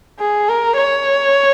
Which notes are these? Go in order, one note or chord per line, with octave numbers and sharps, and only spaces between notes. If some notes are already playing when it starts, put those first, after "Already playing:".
G#4
A#4
C#5